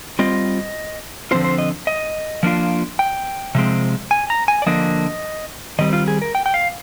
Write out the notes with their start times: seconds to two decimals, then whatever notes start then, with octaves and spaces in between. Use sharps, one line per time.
0.19 G3 C4 F4 D#5
1.31 D3 F3 C4 F4 C5
1.44 C5
1.58 D#5
1.87 D#5
2.43 F3 A#3 D4 F4
2.99 G5
3.55 C3 F3 G#3 C4
4.11 G#5
4.30 A#5
4.48 G#5
4.62 D5
4.66 D3 F3 A#3 D4 D#5
5.79 D#3 G3 C4 D#5
5.93 F4
6.08 G#4
6.22 A#4
6.35 G5
6.46 G5
6.54 F5